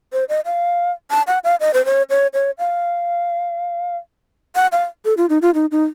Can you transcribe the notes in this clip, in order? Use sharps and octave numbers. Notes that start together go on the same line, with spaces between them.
C5
D#5
F5
A5
F#5
F5
D#5
C5
C#5
C#5
C#5
F5
F#5
F5
A4
F4
D#4
F4
D#4
D#4